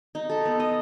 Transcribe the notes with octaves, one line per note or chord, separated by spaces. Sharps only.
D#4
A4
B3
D#5